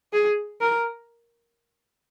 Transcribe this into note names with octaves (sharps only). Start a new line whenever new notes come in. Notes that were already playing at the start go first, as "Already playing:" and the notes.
G#4
A#4